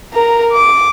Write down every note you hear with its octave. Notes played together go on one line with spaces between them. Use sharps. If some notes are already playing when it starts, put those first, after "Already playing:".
A#4 A#5
D6